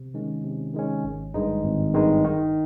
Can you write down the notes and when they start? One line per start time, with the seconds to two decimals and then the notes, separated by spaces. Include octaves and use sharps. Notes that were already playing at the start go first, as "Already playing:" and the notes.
Already playing: C3
0.14 D#3 G#3 C#4
0.44 C3
0.74 D#3 G#3 C#4
1.04 G#1
1.34 G2 D#3 G#3 D#4
1.64 G#1
1.94 G2 D#3 G#3 D#4
2.24 D#3